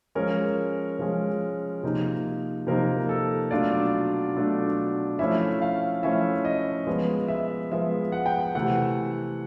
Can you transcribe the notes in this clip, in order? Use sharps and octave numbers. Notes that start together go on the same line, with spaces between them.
F3 G#3 C#4 A#4
F3 G#3 C#4
C3 F3 A#3 D#4
C3 F3 A#3 D#4 A#4
A4
B2 F#3 A3 D4 F4 D5
B2 F#3 A3 D4 F4
F3 A3 C#4 E4 E5
F5
F3 A3 C#4 E4 E5
D#5
F3 G#3 B3
E5
F3 G#3 B3 E5
F#5
G5
F#5
C3 E3 A3 F#5